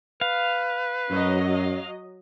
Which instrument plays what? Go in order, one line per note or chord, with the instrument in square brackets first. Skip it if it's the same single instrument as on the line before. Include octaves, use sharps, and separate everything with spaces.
[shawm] B4 [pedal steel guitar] F5
[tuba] F#2 [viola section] F#3 D#5